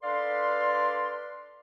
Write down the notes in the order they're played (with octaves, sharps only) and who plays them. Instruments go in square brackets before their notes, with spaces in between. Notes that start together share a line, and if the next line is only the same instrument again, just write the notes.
[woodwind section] D4 A4 B4 D5 F5 C6